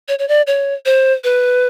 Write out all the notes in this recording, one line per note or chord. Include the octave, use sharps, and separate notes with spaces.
C#5
C#5
D5
C#5
C5
B4